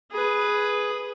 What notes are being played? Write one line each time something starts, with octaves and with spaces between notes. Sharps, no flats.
G#4 B4